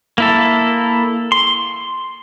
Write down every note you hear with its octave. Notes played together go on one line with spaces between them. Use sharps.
A#3 E4 A4
C6